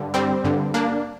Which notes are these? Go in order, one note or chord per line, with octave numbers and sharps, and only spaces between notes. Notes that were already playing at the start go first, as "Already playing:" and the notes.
Already playing: G2 D3
G3 C4
G2 D3
A#3 D4